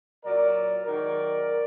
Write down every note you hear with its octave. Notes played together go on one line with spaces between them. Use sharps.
A#2 F#3 A#4 D5
G#2 D#3 F#3 A#4 D5